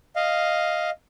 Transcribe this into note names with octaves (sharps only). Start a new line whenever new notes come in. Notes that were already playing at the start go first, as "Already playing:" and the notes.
D#5 F5